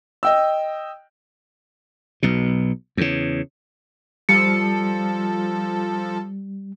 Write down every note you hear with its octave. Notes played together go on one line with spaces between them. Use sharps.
D#5 G5 E6
B1 B2
E2 C#3
F3 G3 A4 C#7